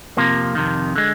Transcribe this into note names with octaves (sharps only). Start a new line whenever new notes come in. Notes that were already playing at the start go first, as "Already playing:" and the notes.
F2 C3 F3 A#3
F2 C3 D#3
D3 G#3